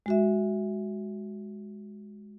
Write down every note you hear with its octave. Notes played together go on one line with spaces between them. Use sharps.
G#3 F#4 E5